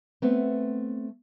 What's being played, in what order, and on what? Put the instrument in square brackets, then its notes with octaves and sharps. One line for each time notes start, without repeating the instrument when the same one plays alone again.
[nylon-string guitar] A3 B3 C4